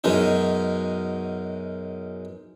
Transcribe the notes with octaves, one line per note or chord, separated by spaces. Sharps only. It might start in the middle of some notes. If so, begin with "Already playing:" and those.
F#2 B2 G#3 C#4 D#4